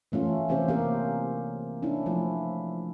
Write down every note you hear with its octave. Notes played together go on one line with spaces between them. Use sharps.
E3 A3 C#4 F4
C3 E3 C4 C#4 G4 C5
A#3 C#4 G4 A#4
C#4 D4 E4
F3 A3 E4 F4